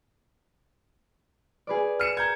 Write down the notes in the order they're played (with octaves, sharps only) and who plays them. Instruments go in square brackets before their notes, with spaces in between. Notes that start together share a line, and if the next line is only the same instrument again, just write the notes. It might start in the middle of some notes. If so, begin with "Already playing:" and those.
[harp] G#4 B4 D5
[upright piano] F6 C#7 E7
A#5 G6 G#6